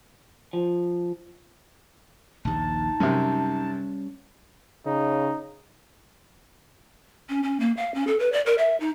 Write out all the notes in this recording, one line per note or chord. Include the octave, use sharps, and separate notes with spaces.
F3
A#1 D#2 D#4 A5
F#2 C3 G3 C#4
C#3 D#4
C#4
C#4
A#3
F5
C#4
A4
B4
D5
A#4
E5
D#4